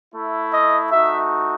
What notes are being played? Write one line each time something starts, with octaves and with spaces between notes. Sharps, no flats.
A3 E4
D#5
A3 D#4 F#4 E5